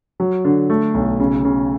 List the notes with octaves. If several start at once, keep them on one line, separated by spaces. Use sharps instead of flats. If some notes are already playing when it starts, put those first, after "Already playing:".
F#3
D3
A3
B1
C#3
C#3